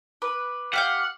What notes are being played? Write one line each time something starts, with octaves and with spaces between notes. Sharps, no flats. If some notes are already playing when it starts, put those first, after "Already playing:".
B4 D6
G4 F5 F#5 F6 G6